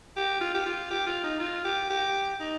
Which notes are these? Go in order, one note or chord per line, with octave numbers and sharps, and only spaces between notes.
G4
F4
G4
F4
G4
F4
D#4
F4
G4
G4
D#4